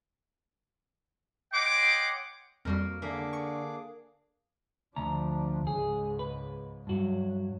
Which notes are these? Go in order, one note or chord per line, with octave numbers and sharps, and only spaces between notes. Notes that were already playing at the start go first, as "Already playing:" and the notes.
C#5 D#5 F#5 G5 C6 D6
F2 G3 A#3 F#4 A#4
D3 A#3 D4 G#4 E5 D6
C#6 C#7
D2 F3 D4 A#5
C#2 G#2 G#4
B4
G2 F#3 F#4